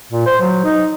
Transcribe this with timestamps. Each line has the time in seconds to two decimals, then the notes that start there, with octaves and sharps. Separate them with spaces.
0.12 A#2
0.26 C5
0.40 F#3
0.64 D#4